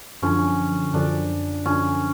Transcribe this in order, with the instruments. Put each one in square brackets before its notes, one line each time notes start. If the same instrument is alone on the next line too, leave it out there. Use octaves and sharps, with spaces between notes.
[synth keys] F#2 D3 F3 [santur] C#4
[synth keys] F#2 D3 F3 [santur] D4
[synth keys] F#2 D3 F3 [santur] C#4